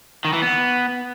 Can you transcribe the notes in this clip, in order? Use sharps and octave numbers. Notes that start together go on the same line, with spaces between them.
D#3
E3
B3